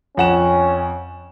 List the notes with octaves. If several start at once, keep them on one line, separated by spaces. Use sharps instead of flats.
F2 C#4 F#5 E7